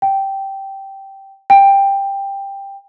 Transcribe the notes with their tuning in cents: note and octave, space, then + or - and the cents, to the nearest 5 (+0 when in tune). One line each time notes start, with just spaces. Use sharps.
G5 -10
G5 +10